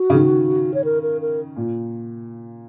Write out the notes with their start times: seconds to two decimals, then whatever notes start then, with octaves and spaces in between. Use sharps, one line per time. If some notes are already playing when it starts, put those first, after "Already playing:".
Already playing: F#4
0.10 C#3
0.14 D#3
0.74 C#5
0.85 A#4
1.03 A#4
1.21 A#4
1.57 A#2